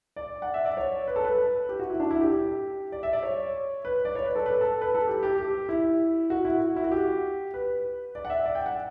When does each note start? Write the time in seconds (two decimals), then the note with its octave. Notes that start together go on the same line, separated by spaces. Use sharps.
0.16 D5
0.42 F#5
0.54 E5
0.65 D5
0.77 C#5
1.08 B4
1.16 A4
1.25 B4
1.69 G4
1.80 F#4
1.90 E4
2.00 D4
2.11 E4
2.21 G4
2.31 G4
2.92 D5
3.03 E5
3.13 D5
3.23 C#5
3.85 B4
4.05 D5
4.15 C#5
4.26 B4
4.36 A4
4.46 B4
4.61 A4
4.82 B4
4.95 A4
5.07 G4
5.23 G4
5.38 G4
5.69 E4
6.30 F#4
6.45 E4
6.57 F#4
6.76 E4
6.84 F#4
6.91 G4
7.54 B4
8.15 D5
8.25 F#5
8.30 E5
8.46 D5
8.55 G5
8.66 F#5